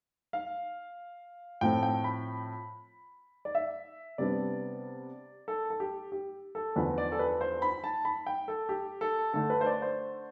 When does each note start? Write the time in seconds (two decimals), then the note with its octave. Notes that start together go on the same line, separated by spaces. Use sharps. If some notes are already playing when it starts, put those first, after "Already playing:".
0.33 F5
1.61 A2 F3 A3 C4 G5
1.83 G5
2.04 B5
3.45 D5
3.55 E5
4.18 C3 G3 B3 D4 D5
5.48 A4
5.70 A4
5.80 G4
6.12 G4
6.55 A4
6.76 E2 D3 F3 B4
6.98 D5
7.12 A4
7.19 B4
7.41 C5
7.62 B5
7.84 A5
8.05 B5
8.27 G5
8.48 A4
8.69 G4
9.01 A4
9.33 D3 A3 D4 A4
9.50 B4
9.61 C5
9.66 D5
9.82 C5